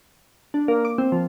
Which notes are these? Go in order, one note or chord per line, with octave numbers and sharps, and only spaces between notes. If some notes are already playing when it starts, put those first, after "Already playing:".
D4
A#3
D6
C4
F3